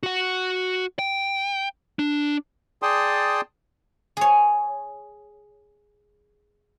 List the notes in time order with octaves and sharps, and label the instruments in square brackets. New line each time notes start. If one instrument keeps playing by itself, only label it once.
[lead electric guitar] F#4 F#5
G5
D4
[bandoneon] G#4 D5 G5 A5 C6 D#6
[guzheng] G#4 C#5